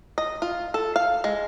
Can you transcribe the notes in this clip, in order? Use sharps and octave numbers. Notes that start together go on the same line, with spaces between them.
D#5
F4
A4
F5
G#3